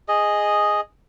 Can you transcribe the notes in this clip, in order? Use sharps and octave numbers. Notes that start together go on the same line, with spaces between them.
G#4 D#5